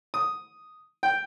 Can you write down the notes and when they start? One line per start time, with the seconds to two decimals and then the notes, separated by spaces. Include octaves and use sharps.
0.14 D#6
1.03 G5